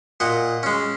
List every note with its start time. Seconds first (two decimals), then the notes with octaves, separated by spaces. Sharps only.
0.20 A#2 D#5 F#5
0.63 G#3 C#4